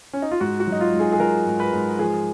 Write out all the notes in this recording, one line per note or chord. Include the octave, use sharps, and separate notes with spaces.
C#4
D#4
F4
G#2 F#4
F#4
F#3
D#4
F4
G#2
G#4
G#4
F#3 A#4
G#2
B4
G#2
F3 G#4